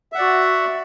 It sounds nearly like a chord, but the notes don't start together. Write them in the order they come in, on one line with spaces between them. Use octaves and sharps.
E5 F#5 D5 F#4